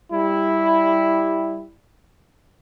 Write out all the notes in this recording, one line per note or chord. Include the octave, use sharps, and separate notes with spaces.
G3 E4